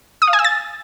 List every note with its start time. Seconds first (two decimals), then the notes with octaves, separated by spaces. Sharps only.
0.22 D#6
0.27 F5
0.33 G#5
0.39 E6
0.44 A6